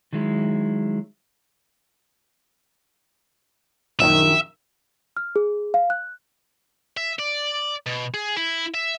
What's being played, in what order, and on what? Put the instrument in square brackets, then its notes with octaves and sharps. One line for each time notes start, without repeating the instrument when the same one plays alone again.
[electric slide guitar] D#3 F#3 G#3 E4
[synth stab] A#1 F#2 D#3 [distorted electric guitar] E5
[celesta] F6
G#4
F5
F#6
[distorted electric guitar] E5
D5
B2
G#4
E4
E5